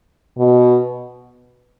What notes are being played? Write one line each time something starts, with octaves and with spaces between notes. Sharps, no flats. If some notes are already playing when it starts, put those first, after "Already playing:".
B2